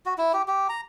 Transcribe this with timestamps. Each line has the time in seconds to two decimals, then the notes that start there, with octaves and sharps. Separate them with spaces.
0.06 F#4
0.18 E4
0.34 G4
0.48 G4
0.69 A#5